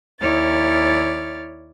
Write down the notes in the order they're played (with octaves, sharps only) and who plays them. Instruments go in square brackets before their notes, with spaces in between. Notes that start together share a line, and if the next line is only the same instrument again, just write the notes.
[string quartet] D#2 E4 C#5 D5 F6 A6